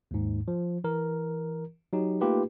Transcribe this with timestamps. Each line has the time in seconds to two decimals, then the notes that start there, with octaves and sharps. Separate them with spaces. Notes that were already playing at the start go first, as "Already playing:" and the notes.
0.11 D#2 G#2
0.48 F3
0.84 E3 A#4
1.93 F#3 D#4 G4
2.21 A3 A#3 D#4 F4 G4 B4